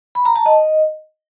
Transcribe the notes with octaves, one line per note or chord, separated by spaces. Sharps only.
B5
A#5
A5
D#5